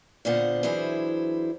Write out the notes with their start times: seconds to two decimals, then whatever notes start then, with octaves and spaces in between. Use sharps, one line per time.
0.25 A#2 D3 B3 C5 F5 F#5
0.63 E3 F#3 D4 E4 G#4 C5